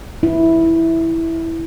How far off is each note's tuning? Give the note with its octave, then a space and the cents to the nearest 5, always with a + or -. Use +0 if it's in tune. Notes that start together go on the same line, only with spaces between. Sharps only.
E4 -5